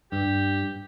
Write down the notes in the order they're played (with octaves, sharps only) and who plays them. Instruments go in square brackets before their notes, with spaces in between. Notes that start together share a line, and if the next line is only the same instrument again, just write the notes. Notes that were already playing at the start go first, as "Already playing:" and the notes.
[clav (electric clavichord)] G2 [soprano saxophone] G4